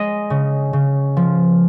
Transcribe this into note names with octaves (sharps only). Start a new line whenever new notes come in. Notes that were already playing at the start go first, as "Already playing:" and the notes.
Already playing: G#3 D#5
C#3
C#3
F3